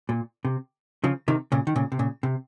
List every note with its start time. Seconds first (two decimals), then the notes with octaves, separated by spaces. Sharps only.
0.09 A#2
0.45 C3
1.04 C#3 F3
1.28 C3 D#3
1.52 A#2 C#3
1.67 D#3
1.76 A#2 C#3
1.92 C3
1.99 A#2 C#3
2.23 C3